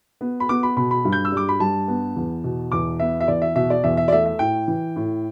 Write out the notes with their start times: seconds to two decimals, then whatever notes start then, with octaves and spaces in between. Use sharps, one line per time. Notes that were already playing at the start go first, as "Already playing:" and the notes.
0.21 B3
0.40 B5
0.49 B3 D6
0.63 B5
0.77 B2 B5
0.91 B5
1.05 G2
1.13 G6
1.25 E6
1.32 G3 D6
1.49 B5
1.60 G2 A5
1.88 B3
2.16 E2
2.44 B2
2.72 E2 D6
3.00 B3 E5
3.20 E5
3.28 E2 D5
3.42 E5
3.55 B2 E5
3.70 D5
3.84 E2 E5
3.97 E5
4.08 D5
4.12 A3 E5
4.26 E5
4.39 A2 G5
4.68 E3
4.96 A2